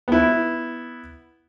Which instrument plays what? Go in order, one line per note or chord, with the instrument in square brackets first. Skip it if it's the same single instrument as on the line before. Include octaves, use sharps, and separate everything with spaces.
[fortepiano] B3 E4